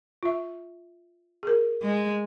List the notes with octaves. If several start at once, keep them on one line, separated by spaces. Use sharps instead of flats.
F4 E5
G#4 A#4
G#3